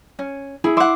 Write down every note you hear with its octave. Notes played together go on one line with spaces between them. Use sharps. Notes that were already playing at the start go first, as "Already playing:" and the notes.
C#4
E4 G#4
E5 F#5 C6 D6